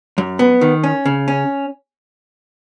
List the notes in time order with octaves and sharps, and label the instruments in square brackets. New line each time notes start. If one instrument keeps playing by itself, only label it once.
[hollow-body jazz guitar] F#2
B3
D#3
C#4
C#3
C#4